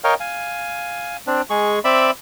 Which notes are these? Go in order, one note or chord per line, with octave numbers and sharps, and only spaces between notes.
A#4 C#5 D#5 F5 G5
F5 G#5
C4 D4
G#3 G#4 C#6
C4 D5 E5 B5